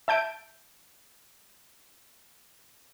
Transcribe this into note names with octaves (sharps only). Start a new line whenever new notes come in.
E5 A5 G6 D7